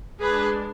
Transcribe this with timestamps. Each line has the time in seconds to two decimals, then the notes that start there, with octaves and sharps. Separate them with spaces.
0.21 G#3 D4 G#4 B4